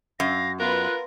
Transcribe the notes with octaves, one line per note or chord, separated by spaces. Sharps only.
F#2 F5 A#6
B3 F4 A#4 B4 F#6